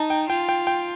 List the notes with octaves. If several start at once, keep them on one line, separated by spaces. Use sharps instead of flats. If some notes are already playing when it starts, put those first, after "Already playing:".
Already playing: D#4 A5
G5
F4 G5
G5
G5